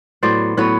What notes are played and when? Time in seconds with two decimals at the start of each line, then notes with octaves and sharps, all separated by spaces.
0.23 A2 F#3 B3 C5 D5
0.57 A2 F#3 B3 B4 C#5